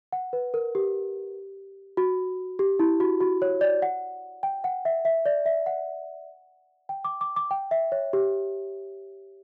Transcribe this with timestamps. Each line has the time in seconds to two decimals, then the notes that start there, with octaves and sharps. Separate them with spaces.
0.13 F#5
0.33 B4
0.54 A#4
0.75 G4
1.97 F#4
2.59 G4
2.79 E4
3.00 F#4
3.21 F#4
3.42 C#5
3.61 D5
3.82 F#5
4.43 G5
4.64 F#5
4.85 E5
5.05 E5
5.26 D5
5.46 E5
5.66 F#5
6.89 G5
7.05 D6
7.21 D6
7.36 D6
7.51 G5
7.71 E5
7.92 C#5
8.13 G4